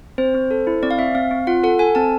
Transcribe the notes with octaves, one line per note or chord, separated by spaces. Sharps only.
C4 C5
C4
A4
E4
C4 D5
F5
C4 E5
C4 F5
C4
F4 F#5
A4 F#5
A4 G#5
C4 A5